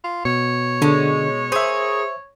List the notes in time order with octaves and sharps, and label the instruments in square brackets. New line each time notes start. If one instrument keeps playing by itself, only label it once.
[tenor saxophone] F4
[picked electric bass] B2 [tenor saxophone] C#5
[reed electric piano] D3 [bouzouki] G#3 C#4
[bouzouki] A#3 G#4 [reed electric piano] C5 E5